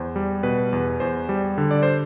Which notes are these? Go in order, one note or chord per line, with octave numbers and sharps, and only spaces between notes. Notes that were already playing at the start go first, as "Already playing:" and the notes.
Already playing: E2 C5
G3
B2 B4
E2
E2 C5
G3
D3
D5
C5